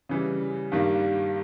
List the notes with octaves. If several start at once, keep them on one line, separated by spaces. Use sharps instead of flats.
C#3 E3 G3
G2 D#3 G3 A#3